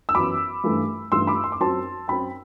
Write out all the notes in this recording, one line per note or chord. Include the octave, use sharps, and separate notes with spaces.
E6
F#2 E3 B3 B5 D6
G2 E3 A3
G2 E3 A3 C6 E6
B5 D6
C6
D6
F#2 F#3 C4 A5 C6
F#2 F#3 C4 G5 B5